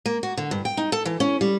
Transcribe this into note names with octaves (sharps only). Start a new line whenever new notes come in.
A#3
F#4
D3
G2
G5
D#4
A4
E3
C#4
G3